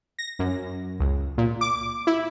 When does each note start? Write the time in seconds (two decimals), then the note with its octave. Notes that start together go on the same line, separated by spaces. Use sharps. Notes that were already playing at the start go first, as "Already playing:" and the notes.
0.19 A#6
0.39 F#2
1.00 C#2
1.38 A#2
1.61 D6
2.07 E4